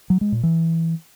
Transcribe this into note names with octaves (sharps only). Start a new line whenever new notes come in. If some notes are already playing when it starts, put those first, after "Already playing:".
F#3
G#3
A#2
E3